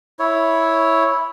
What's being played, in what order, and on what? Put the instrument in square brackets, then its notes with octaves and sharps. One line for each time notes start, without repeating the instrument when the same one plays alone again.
[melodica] E4 C#5